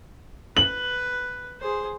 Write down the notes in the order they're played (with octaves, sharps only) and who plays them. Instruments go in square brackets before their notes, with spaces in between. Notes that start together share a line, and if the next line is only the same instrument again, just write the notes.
[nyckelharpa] B4 [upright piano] F#7
[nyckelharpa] G#4 C5